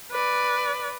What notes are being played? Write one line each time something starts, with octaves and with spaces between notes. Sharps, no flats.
B4 D5